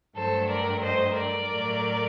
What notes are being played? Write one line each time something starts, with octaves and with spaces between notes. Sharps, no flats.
G2 F#3 A3 A4 C5
A#4 D5
C5 D#5
A#4 D5
A2 F#3 A3